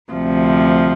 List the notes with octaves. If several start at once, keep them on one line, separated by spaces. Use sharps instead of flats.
D2 C3 F3